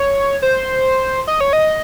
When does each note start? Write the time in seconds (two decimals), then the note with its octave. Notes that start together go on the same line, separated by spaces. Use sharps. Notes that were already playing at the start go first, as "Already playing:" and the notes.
Already playing: C#5
0.42 C5
1.27 D#5
1.41 C#5
1.53 D#5